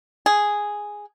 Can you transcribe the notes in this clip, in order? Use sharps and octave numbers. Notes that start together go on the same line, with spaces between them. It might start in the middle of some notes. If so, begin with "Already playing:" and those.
G#4